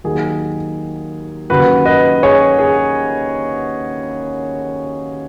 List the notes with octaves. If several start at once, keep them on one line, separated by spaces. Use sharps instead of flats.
D#2 D#3 F#3 G#4
D#2 C#3 F#3 F#4 B4
B4 D#5
G#4 C#5
G#4